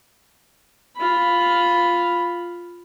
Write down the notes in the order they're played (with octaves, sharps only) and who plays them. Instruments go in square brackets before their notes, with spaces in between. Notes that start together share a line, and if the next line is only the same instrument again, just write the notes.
[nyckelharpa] F4 B5